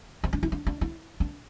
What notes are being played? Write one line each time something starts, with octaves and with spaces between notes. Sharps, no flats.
C4
D4
E4
D4
D4
E4
D4